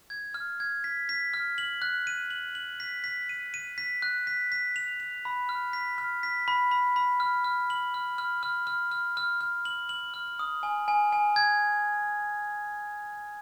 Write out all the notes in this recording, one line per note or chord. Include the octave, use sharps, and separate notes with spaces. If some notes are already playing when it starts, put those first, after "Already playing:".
G#6
F6
G#6
B6
B6
F6
F#7
F#6
D#7
F#7
F#7
B6
B6
D#7
D#7
B6
F#6
B6
B6
F7
F7
B5
F6
B6
F6
B6
B5
B5
B5
F6
F6
F#7
F6
F6
F6
F6
F6
F6
F6
F#7
F#7
F6
D#6
G#5
G#5
G#5
G#6